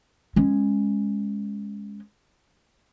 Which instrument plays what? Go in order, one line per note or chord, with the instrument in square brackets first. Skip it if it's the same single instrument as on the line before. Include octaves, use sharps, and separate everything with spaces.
[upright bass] G#3 C#4